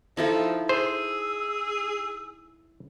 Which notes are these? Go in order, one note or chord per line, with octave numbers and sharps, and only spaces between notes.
F3 D#4 E4 A4
G#4 C5 E6